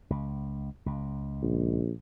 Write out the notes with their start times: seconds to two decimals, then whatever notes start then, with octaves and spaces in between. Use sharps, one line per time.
0.10 C#2
0.86 C#2
1.42 A#1